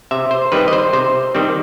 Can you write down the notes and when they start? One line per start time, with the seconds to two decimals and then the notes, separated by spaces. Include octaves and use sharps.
0.11 C3 E5
0.31 C5
0.52 D#3 G3 C4 B4
0.68 D#5
0.73 C5
0.93 C3 C5
1.35 D#3 G3 C4